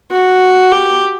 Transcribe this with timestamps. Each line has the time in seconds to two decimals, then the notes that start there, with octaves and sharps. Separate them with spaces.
0.11 F#4
0.72 G4